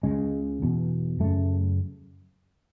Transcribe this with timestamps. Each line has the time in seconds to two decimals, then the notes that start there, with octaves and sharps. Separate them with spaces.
0.03 C#2 C#3 G#3
0.62 E2 B2
1.20 F#2 C#3 A3